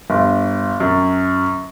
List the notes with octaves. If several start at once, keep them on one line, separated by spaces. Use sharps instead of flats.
G1
F#2